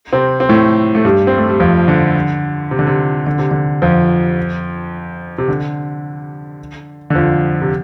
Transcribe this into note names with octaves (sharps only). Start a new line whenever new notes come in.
C3 C4
C4
A2 A3
A3
G2 G3
C4
A3
G3
F2 F3
D3
C3
D3
C3
D3
C3
D3
F2 F3
C3
D3
D3
F2 F3
C3